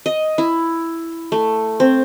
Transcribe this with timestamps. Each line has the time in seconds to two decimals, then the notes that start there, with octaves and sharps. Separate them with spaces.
0.06 D#5
0.38 E4
1.32 A3
1.80 C4